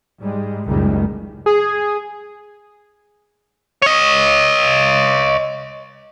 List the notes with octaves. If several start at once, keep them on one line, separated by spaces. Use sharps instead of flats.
G#2 G3 G#3
F#1 C#2 A2 D#3 G3 G#3
G#4
C#5 D#5